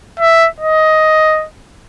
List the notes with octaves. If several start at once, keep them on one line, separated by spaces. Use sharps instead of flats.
E5
D#5